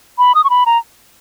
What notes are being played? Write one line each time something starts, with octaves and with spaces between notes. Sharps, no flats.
B5
D#6
C#6
B5
A#5